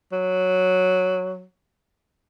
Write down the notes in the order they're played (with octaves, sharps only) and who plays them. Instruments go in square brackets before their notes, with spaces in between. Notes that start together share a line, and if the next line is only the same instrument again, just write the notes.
[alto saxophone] F#3